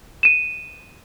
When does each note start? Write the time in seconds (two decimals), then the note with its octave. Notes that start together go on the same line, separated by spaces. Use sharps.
0.23 D#7 E7